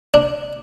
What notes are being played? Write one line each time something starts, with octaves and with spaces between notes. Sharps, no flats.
D4